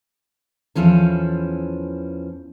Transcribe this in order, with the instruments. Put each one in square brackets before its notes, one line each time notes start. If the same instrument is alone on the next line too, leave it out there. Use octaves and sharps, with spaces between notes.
[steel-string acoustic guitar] E2 E3 F3 C#4 A4